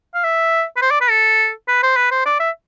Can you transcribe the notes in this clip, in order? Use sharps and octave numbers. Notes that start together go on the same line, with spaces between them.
F5
E5
B4
C5
D5
B4
A4
B4
C5
B4
C5
D5
E5